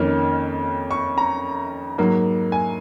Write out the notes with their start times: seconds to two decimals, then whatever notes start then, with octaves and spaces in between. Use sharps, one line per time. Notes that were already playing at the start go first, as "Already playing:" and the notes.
Already playing: F2 D#3 A#3 C#4 F6
0.91 C#6
1.18 A#5
1.98 G#2 F#3 A#3
2.52 G#5